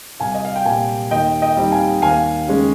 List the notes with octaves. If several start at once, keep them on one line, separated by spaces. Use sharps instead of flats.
C2 F5 G#5
D#5
F5
G5
A#2 G3 F5 G#5
D#2 D#5 G5
D#5 G5
D#3 G3 C4
F5 G#5
D#2 F5 G#5
C#3 G#3 C#4